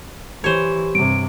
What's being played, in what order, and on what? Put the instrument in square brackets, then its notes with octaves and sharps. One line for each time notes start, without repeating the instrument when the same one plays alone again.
[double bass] E3 [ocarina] G4 [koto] C5 C#5
[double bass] G2 C3 [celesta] D7